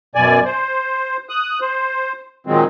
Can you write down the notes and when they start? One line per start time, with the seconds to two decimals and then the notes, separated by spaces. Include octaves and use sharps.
0.15 F#2 B2 D5 G#5
0.45 C5
1.29 D#6 F#6
1.61 C5
2.47 A#2 D#3 F#3 G#3 C4